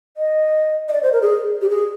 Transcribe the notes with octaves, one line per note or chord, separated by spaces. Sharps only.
D#5
D#5
D5
C5
A#4
G#4
G4
G#4